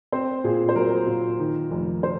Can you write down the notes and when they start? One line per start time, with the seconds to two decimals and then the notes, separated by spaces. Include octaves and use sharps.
0.12 C4 C5
0.44 A#2 G#4
0.69 C5
0.76 F#3 A#4
1.07 A#2
1.40 D#3
1.71 F1
2.03 C5